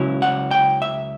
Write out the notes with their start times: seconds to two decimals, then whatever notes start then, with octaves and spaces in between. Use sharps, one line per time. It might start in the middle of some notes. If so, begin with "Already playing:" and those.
Already playing: C#2 C#3 F#3 C#4 E4
0.22 F#5
0.51 G5
0.82 E5